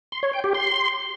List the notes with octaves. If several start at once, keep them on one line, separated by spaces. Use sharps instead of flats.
C6
C#5
G5
G4
C6